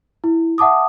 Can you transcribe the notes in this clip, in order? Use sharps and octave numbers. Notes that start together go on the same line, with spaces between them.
E4
E5 F#5 A5 D6 D#6